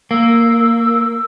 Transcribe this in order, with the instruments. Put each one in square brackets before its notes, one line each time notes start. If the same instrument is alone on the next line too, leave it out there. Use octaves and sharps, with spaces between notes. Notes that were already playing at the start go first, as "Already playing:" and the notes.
[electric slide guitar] A#3 [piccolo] E6